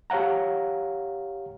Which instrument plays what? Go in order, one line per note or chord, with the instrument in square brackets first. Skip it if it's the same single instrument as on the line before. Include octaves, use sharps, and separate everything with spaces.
[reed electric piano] G4 C#5 F5 F#5 A#5